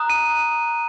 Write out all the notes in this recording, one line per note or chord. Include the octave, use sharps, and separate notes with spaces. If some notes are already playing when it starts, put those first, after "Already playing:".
Already playing: A#5 D#6 F#6
D#7